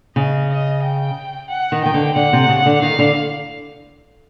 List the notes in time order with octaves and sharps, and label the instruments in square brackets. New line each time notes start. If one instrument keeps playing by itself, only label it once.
[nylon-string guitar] C#3 [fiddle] D#5
[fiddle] D#5
G5
F#5
[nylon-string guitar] D#3
[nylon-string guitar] D#3 [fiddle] G5
[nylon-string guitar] D3
[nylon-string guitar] D3 [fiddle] F#5
[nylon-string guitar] C3
C#3
D3
[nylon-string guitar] D#3 [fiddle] F5
[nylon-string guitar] D3